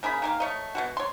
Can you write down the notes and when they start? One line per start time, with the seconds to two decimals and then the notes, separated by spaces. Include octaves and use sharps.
0.03 C#3 A#3 G#4 B5
0.22 D#3 A#3 F5
0.40 A3 C#5 D#5
0.75 B2 G#3 F#4
0.97 C#5 C6